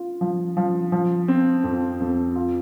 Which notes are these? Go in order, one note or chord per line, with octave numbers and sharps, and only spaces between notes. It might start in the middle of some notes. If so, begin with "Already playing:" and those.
Already playing: F4
F3
F3
F3
C4
F2
F2
F4